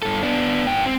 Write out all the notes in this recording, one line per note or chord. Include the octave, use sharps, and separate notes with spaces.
G2 A4
B3 D4
G#2 G5
C4